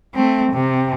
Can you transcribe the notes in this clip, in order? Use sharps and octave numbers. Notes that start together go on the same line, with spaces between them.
A3 C4
C3